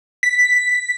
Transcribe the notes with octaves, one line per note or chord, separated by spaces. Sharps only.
B6